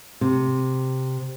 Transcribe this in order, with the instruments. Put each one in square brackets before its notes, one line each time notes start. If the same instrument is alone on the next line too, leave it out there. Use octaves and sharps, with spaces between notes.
[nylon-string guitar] C3